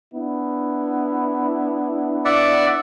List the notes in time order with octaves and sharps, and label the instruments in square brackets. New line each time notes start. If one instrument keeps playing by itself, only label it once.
[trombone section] B3 D4 E4
[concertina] D5 E5 F#5